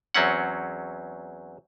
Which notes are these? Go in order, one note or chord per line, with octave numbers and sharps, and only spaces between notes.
E2 F#3 C4 C#4 F#5